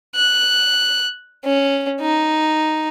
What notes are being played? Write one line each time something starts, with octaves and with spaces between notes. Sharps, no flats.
F#6
C#4
D#4